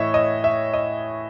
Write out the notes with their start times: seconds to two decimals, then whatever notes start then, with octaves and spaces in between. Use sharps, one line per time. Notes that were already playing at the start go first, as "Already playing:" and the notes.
Already playing: A2 E3 C#5 D#5 E5
0.14 D#5
0.44 E5
0.74 D#5